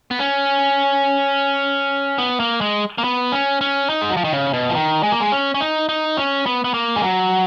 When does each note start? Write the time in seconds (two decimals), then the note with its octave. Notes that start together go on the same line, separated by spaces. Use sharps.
0.11 B3
0.20 C#4
2.18 B3
2.40 A#3
2.61 G#3
2.98 A#3
3.04 B3
3.32 C#4
3.61 C#4
3.90 D#4
4.01 G#3
4.09 F#3
4.17 F3
4.24 D#3
4.33 C#3
4.53 B2
4.70 F3
4.75 D#3
5.03 G#3
5.12 A#3
5.20 G#3
5.32 C#4
5.55 C#4
5.61 D#4
5.89 D#4
6.17 C#4
6.46 B3
6.64 B3
6.74 A#3
6.96 G#3
7.03 F#3